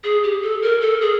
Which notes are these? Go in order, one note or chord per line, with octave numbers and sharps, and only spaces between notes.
G#4
G4
A4
A#4
A4
G#4